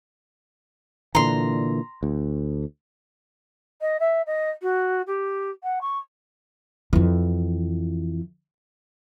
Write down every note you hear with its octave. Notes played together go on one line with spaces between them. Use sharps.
A#2 D3 E3 A#5 C6
D2
D#5
E5
D#5
F#4
G4
F#5
C#6
F2 E3